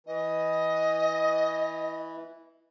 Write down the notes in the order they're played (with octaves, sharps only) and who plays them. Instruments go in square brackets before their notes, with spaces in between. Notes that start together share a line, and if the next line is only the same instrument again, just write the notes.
[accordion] E3 [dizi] D#5